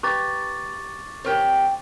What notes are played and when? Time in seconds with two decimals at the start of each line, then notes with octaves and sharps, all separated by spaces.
0.03 G4 B4 A#5 C#6 D6 A6
1.24 C4 G4 A#4 C#5 G5